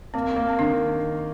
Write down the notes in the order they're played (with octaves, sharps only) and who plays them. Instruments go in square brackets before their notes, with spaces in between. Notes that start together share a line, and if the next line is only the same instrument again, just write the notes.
[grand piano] A#3 [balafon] C4
[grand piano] A#3
[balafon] C4
[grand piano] D#3 [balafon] D4